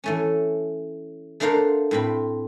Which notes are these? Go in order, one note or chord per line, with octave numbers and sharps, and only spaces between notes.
E3 A3 C#4
A3 D4 A#4 C5 F5 F#5
A2 C4 B5